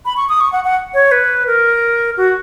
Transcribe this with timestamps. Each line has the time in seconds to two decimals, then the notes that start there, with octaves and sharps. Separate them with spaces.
0.05 B5
0.17 C#6
0.29 D#6
0.41 C#6
0.53 F#5
0.64 F#5
0.94 C#5
1.11 B4
1.47 A#4
2.17 F#4